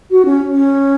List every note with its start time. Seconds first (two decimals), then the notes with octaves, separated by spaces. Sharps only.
0.10 F#4
0.25 C#4
0.51 C#4